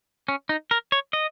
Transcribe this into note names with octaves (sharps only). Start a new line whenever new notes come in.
C#4
D#4
A#4
C#5
D#5